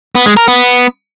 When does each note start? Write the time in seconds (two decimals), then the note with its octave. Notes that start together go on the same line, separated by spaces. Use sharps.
0.15 B3
0.26 G#3
0.37 A#4
0.48 B3